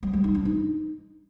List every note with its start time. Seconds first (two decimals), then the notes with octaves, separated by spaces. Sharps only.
0.03 G3
0.13 G3
0.24 D#4
0.35 D4
0.45 D#4